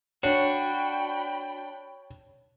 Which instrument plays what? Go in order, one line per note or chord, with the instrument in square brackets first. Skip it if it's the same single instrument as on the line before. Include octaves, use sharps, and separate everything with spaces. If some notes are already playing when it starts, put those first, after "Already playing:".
[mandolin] D4 [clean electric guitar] F#4 [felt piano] C#5 [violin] G5 B5